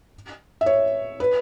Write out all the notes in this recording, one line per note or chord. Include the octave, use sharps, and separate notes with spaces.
E5
C#5
B4